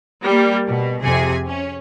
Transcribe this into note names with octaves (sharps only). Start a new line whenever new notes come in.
G3 A#3
B2
F2 C3 G#4 G#5
C#4